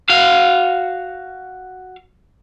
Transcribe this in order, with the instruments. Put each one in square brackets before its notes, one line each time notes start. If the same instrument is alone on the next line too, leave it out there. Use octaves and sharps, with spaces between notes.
[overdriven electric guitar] F#4 F5